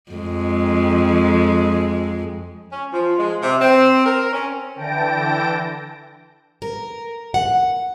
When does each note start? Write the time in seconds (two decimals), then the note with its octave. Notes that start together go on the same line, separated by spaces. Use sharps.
0.12 F2 G#3
2.70 C#4
2.92 F3
3.18 G#3
3.41 C3
3.60 C4
4.06 A#4
4.33 C#4
4.76 D3 E3 G5 A5 A#6 D7
6.62 A#4
7.34 F#5